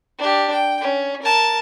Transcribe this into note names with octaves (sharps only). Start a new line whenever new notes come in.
D4 G4
G5
C#4
A#4 A5